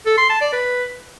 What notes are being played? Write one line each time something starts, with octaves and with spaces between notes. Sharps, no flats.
A4
C6
A5
D5
B4